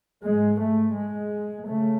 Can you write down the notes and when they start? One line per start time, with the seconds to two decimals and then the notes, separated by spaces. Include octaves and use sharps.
0.24 G#2 G#3
0.60 A3
0.95 G#3
1.67 C#3 A3